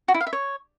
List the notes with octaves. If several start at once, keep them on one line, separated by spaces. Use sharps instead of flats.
F#4
E4
F5
E5
C#5